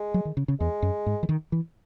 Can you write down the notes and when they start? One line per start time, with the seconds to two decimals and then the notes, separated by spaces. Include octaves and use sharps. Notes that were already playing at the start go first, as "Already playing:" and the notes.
Already playing: G#3
0.14 F#3
0.25 D#3
0.37 C#3
0.48 C#3
0.60 E2 G#3
0.82 F#2
1.06 G#2
1.23 E3
1.29 D#3
1.52 E3